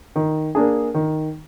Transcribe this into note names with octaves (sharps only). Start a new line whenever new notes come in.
D#3
A#3 D4 G#4
D#3